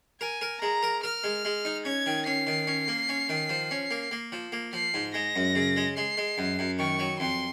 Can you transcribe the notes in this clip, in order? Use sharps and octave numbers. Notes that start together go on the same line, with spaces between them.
A#4 G#5
A#4
G#3 A#5
A#4
A#4 F6
G#3
G#3
D#4
C#4 G#6
D#3
C#4 C7
D#3
C#4
A#3
C#4
D#3
F3
C#4
A#3
A#3
F3
A#3
F3 C7
G#2
G#3 A#6
F#2
C#3
G#3
G#3 C7
G#3
F#2
F#2
D#3 C#6
F#3
F2 C6